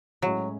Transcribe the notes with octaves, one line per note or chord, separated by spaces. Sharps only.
A2 F#3 G#3 C#4 E4